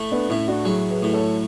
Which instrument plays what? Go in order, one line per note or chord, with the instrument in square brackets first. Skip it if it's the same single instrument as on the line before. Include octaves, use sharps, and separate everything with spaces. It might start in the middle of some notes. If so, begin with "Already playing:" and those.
Already playing: [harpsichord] A2 A3
[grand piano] B3 D4
[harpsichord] A2 [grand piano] C#4 E4
[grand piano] D4 F#4
[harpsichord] F#3 [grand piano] E4 G#4
[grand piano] G#4 B4
[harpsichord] A2
[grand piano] A4 C#5